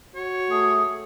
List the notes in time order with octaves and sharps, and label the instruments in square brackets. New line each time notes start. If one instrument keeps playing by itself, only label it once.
[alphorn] F#4 [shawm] C#5
[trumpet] A3 [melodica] G#4